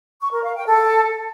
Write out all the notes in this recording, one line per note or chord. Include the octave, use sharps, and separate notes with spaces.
C#6
A#4
F5
G5
A4